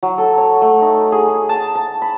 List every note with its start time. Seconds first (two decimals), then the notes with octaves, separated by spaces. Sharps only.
0.03 F#3
0.18 A4
0.37 C#5
0.62 A3
0.82 D#4
1.12 G#4
1.29 G#4
1.49 A5
1.75 A5
2.02 B5